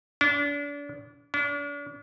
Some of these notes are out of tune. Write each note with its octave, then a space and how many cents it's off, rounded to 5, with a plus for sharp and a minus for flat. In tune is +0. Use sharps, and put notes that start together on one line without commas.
D4 -35
D4 -40